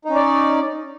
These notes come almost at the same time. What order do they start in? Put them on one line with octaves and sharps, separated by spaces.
D#4 C#4 D5